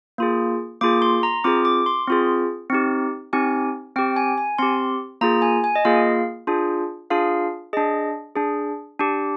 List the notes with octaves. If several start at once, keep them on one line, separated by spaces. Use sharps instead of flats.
A#3 F4 G#4
A#3 F4 G#4 D6
C6
A#5
C4 F4 G#4 D6
D6
C6
C4 F4 G#4
C4 D#4 G4
C4 D#4 G4 G#5
C4 G4 G5
G#5
G#5
C4 G4 C6
A#3 F4 G#4 A#5
G#5
G#5
D#5
A#3 F4 G#4 F5
D4 F4 G#4
D4 F4 G#4 F5
D4 G#4 D#5
D4 G#4
D4 G4